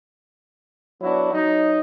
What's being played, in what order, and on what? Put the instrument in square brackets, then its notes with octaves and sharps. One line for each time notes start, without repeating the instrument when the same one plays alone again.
[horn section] F#3 B3 D4 E4 F#4
F#3 D#4